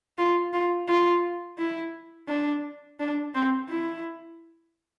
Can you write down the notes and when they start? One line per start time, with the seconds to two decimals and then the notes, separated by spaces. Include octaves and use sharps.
0.18 F4
0.53 F4
0.88 F4
1.58 E4
2.28 D4
3.00 D4
3.34 C4
3.69 E4